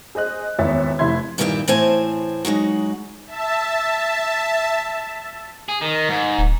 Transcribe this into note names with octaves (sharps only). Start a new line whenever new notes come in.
G#4 C5 D#5 F#6
G#1 E2 C#5 E5 A6
F1 E4 E5 B5 C6 G#6
G2 A#2 D#3 E3 G4 E5
A2 E3 C4 C5 G#5 A5
F#3 G#3 D#4 F#4
E5 A5
G#4
D#3
G#2
D1